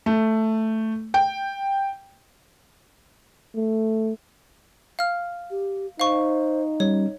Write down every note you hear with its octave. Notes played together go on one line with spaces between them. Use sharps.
A3
G5
A3
F5 F6
G4
D#4 C5 F5 C#6
G3 C#4 C#5